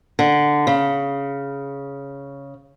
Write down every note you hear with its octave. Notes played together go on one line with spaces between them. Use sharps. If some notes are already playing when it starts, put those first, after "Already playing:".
D3
C#3